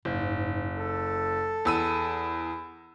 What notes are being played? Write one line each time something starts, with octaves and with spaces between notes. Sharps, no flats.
F#1 G#2
A4
E2 E6 D#7